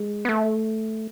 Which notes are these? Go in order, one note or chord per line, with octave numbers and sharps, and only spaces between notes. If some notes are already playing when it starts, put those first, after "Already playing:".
Already playing: G#3
B3
A3